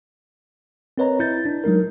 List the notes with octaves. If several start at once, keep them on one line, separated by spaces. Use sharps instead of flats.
C4 A#4 B4 C#5 D#5 A#5
E4 G6 A6
D4
F#3 G#3 D#4 A#4